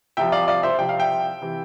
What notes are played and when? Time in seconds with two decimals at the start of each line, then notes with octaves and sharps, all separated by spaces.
0.17 C2 C3 F3 E5 G5
0.32 D5 F5
0.48 D5 F5
0.63 C5 E5
0.78 C2 C3 F3 G5
0.89 F5
0.99 E5 G5
1.41 C3 E3